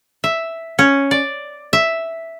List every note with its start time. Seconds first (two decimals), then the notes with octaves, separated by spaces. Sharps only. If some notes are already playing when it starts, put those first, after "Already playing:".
0.24 E5
0.79 C#4
1.11 D5
1.73 E5